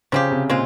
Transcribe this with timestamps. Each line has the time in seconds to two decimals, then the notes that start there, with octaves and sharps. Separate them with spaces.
0.12 C#3 F3 C4 G4
0.32 C3
0.49 A#2 G#3 C4 F4